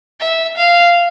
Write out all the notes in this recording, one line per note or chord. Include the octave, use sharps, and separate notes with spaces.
E5
F5